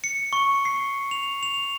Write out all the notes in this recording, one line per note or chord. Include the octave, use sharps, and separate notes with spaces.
C#7
C#6
C7
F7
F7